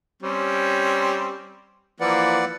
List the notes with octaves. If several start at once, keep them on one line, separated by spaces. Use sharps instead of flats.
G3 C4 C#4
E3 F3 A#3 B4 D5 F#5